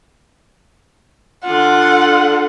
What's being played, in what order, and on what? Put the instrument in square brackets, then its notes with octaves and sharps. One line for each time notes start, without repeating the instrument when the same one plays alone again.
[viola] D3 F4 [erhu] F#5